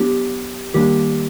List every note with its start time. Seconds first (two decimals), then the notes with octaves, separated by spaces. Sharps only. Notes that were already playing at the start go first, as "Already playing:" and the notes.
Already playing: F#3 B3 D4 G4
0.74 D#3 G3 A#3 D4 G4